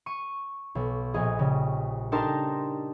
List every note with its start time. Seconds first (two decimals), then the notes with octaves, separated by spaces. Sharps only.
0.06 C#6 D#7
0.75 B1
1.14 A#1 G#4 D#5
1.39 C#3 G3
2.12 D4 D#4 G4 A#4 A5 C6